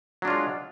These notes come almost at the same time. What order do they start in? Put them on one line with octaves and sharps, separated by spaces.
F#3 D4 F4 G#3